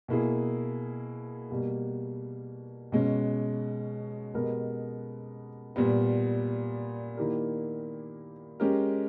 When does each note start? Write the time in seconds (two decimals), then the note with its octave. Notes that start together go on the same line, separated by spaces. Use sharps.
0.08 B2 A#3 E4 G#4
1.50 B2 G3 A#3
2.92 B2 G#3 C#4
4.34 B2 G#3 B3 G4 A#4
5.76 A#2 G3 B3
7.17 D#3 A#3 E4 G4 A#4
8.60 G#3 C#4 G4 A#4